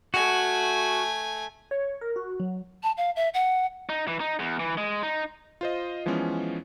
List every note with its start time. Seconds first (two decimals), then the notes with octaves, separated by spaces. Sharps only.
0.14 A3 F#4 G#5
1.71 C#5
2.01 A#4
2.16 F#4
2.40 F#3
2.83 A5
2.97 F5
3.16 E5
3.34 F#5
3.89 D#4
4.08 E3
4.20 D#4
4.39 E2
4.60 E3
4.78 G#3
5.03 D#4
5.61 F4 C5 D#5
6.06 E3 F3 G#3 B3 C#4